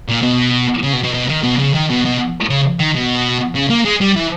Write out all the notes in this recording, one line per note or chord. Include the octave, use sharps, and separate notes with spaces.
A#2
B2
C#3
B2
B2
B2
D#3
B2
C#3
D#3
B2
B2
C#3
D#3
B2
C#3
A#3
G#3
G3
E3